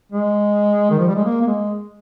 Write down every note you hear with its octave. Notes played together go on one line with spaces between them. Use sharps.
G#3
D#3
F3
G3
G#3
A#3
A#3
G#3